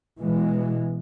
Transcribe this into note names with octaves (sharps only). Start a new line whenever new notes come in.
B2 E3 G#3